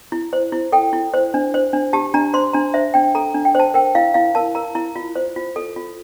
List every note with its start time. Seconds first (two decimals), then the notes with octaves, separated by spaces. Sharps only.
0.12 E4
0.33 C5
0.52 E4
0.72 A4 G5
0.93 E4
1.14 C5
1.34 D4
1.54 C5
1.73 D4
1.93 G4 A5
2.14 D4 A#5
2.34 C5 C6
2.53 D4 A#5
2.74 C5 E5
2.94 D4 G5
3.15 A4 A#5
3.34 D4
3.45 G5
3.55 C5 A5
3.74 A#4 G5
3.95 E4 F5
4.14 E4 F5
4.35 A#4 A5
4.55 A#4 A#5
4.75 E4 A#5
4.96 F4
5.16 C5
5.36 F4
5.56 A4
5.76 F4